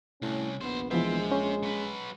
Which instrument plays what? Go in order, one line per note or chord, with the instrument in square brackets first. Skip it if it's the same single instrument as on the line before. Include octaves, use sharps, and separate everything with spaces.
[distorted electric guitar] C2 [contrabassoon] A2 [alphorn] C#4
[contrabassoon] A#1 [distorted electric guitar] D#2 C5 [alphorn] B3
[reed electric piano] E3 F3 B3 [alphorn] G#3 [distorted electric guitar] C5 E5
[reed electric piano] C#4
[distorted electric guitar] F#3 B4